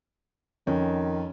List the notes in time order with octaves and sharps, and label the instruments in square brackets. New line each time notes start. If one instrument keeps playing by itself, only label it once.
[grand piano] F2 [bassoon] D#3 [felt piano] C#4